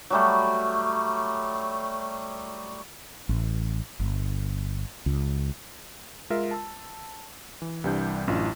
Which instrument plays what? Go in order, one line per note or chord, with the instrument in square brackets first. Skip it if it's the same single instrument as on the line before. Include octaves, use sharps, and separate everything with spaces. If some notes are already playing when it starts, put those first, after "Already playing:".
[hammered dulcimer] F#3 G3 A3
[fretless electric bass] A1
G1
C#2
[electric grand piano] G#3 F4 A#4 E5
A5 E6
E3
C2 E3 G3 D4 G6
A1 F#2 D4 E4 F4